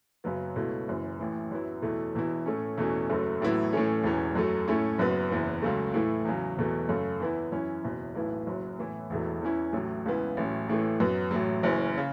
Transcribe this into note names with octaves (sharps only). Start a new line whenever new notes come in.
F#1 F#2 C#3 F#3 B3
C#2 B2 A3 E4
F#1 F#2 E3
A1 A2 E3
F#2 F#3 B3 E4
E2 B2 A3 E4
E1 E2 B2 B3 E4
A2 A3 C#4
E2 B2 A3 C#4
F#1 F#2 F#3 A3
A1 A2 F#3 B3 E4
A2 E3 A3 C#4
E1 E2 E3 C#4
F#2 F#3 A3
A2 A3 C#4 E4
F#1 F#2 F#3 B3
F#1 E2 E3 B3
C#2 C#3 F#3 A3
A2 E3 A3 E4
E2 C#3 F#3
E1 E2 B2 A3
F#2 C#3 A3
E2 E3 B3 E4
F#2 E3 C#4 E4
F#1 E2 B2
B1 A2 E3 B3 E4
F#1 F#2 F#3
A2 E3 B3 E4
E1 E2 B2 A3
E2 E3 C#4 E4
A1 A2 F#3
C#2 C#3 E3 B3 E4
A1 A2 F#3 C#4
A1 A2 E3 A3
F#2 F#3 B3
A1 A2 F#3
F#1 F#2 E3 C#4
C#3